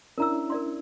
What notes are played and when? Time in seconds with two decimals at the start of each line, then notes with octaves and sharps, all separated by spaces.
0.18 C#4 D4 E4 A#4 A#5 E6
0.50 A#4 D5 C6